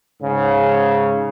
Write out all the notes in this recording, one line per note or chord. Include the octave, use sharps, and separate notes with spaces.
G#2 C#3